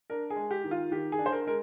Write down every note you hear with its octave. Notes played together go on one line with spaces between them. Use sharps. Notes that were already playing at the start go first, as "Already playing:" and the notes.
D4 A#4
G#4
G#3
G4
D#3
F4
D#3 G4
G#4
D4
C5
A#4
G#3 A#4